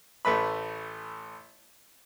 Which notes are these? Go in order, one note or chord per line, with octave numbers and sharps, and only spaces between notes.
A1 A3 B4 B5